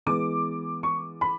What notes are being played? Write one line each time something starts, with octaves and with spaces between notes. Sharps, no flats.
E3 G#3 B3 D6
C#6
B5